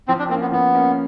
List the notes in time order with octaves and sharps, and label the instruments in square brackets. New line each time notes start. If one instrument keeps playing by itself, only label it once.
[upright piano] F3 [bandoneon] C4
[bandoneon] D4
[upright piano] A#3 [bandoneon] C4
[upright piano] C#4
[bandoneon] B3
[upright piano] F3 [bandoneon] B3
[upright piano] A#3 C#4